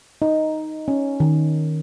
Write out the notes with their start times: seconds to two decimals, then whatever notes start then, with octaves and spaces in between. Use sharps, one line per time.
0.22 D#4
0.88 C#4
1.20 D#3